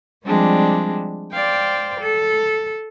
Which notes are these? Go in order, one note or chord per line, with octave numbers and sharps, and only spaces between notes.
F3 G3 G#3 C4 D4
C5 D5 F5 G5
A4